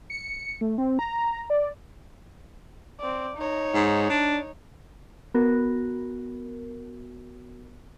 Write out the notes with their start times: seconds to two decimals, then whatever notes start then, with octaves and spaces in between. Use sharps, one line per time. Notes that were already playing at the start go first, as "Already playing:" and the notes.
0.10 C#7
0.61 A3
0.78 C4
0.99 A#5
1.50 D5
3.00 C4 D5
3.38 D#4 C#5
3.75 G#2
4.09 D4
5.34 B3 F#4 A#4